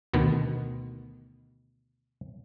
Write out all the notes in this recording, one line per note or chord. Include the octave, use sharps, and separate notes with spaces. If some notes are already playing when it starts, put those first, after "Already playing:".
D2 B2 D#3 B3